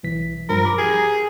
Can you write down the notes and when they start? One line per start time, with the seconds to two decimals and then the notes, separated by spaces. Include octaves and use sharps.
0.03 B1 E3 B6
0.49 G2 F3 A#4 B5
0.65 B5 D6
0.78 G4 G#4